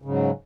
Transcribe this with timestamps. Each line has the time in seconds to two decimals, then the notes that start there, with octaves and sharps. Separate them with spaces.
0.02 C#3
0.05 G#2
0.08 F#3